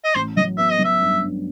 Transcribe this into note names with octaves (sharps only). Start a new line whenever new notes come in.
D#5
A1 C5
F#3 D#5
B3 E5
D#5
F#3
E5
G2
G2